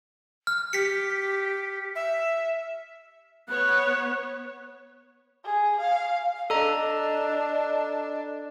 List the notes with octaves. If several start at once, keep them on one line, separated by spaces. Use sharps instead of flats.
F6
G4 B6 C#7
E5
B3 C#5 F#6
G#4
F5
D4 A4 D#5 A#5